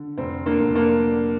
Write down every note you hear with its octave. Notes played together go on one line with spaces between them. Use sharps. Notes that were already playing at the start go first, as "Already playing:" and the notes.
Already playing: D3
F1 C4
A#3 D4
F1
A#3 D4